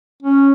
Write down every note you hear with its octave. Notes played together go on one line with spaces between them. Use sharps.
C#4